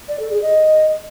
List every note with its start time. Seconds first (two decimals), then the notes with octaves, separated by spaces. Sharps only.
0.08 D5
0.20 A4
0.31 G#4
0.42 D#5